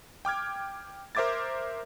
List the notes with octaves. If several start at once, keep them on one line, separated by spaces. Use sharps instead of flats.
G5 D6 F6 G#6
A#4 C5 E5 D6 G#6 A6